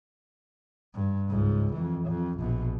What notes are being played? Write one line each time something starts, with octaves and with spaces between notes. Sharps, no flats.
G2
C#2 G#2
F2 E3
F2
A#1 B2